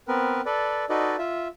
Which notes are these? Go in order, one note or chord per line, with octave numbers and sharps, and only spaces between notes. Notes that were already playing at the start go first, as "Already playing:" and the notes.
B3 C4 A#4 B4
A4 B4 D5
D#4 F#4 A4 B4 D5 D#5
F4 E5